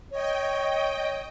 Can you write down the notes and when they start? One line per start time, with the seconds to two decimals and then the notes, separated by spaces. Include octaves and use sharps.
0.11 C#5 D#5 G5